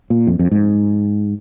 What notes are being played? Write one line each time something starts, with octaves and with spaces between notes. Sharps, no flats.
A#2
F2
F2
G#2